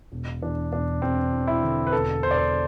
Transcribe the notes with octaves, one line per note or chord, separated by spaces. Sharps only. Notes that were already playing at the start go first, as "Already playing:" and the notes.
E1
E2 D4
E1 D4
E1 C4
E2
E4
D3
B4
E1 A4
E1 C5
D5
C5